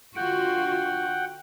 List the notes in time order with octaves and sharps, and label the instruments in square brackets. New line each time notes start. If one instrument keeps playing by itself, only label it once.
[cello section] D3 F4 F#4 [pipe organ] F#5 G5